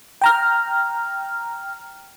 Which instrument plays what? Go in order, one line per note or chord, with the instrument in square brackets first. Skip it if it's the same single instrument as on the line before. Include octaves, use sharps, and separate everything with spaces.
[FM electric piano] G5 A#5 F6